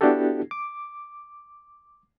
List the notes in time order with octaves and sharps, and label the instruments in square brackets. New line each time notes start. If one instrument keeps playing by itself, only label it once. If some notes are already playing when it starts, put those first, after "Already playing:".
[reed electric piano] B3 D4 E4 F#4 G4 A4
D6